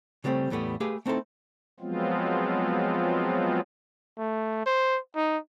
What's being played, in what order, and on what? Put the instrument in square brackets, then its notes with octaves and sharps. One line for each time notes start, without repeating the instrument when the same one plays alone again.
[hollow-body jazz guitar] C#3 G3 A3 A#3 C4
E2 A2 G3 A3 B3
A3 G4 G#4 B4 F5
A3 C4 D#4 E4 A4
[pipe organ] F3 F#3 G#3 B3 C4 F4
[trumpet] A3
C5
D#4